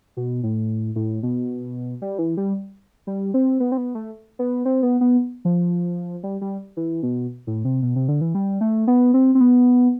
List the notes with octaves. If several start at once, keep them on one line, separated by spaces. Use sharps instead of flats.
B2
A2
A2
B2
G3
E3
G3
G3
C4
B3
C4
B3
A3
B3
C4
B3
B3
F3
G3
G3
E3
B2
A2
C3
B2
C3
D3
E3
G3
A3
B3
C4
C4
B3